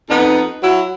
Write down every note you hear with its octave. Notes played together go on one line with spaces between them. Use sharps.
F2 B3 D#4
F#3 E4 F#4